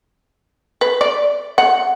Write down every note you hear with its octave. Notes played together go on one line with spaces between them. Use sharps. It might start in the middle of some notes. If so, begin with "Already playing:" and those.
B4
D5
F#5